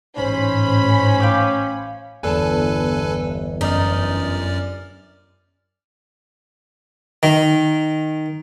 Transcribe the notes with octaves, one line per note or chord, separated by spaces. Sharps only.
A1 G#2 C#4 C5 B5
F5 G5 D6
G1 E2 A4 B4 G#5 A5
F#2 D#4 D5 F6
D#3